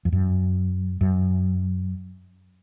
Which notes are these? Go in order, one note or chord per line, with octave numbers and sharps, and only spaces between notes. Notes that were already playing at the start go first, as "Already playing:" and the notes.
F2
F#2
F#2